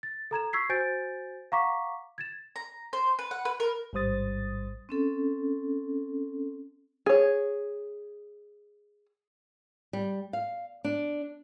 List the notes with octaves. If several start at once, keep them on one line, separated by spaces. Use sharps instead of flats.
A6
A4 A#5 G#6 E7
C#6 E6 G#6 B6 C7
F#4 C5 G#5 G6 A6 D7
F5 F#5 A#5 C#6 D6 B6
G#6 A6 E7
A#5
C5
B4
F#5
B4
A#4
A1 G#2 G3 C5 D#6 A6
C4 C#4 A4
G#4 C#5
G3
F5
D4